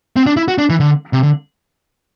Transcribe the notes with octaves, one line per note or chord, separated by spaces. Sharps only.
C4
D4
E4
F#4
D4
E3
D3
C3
D3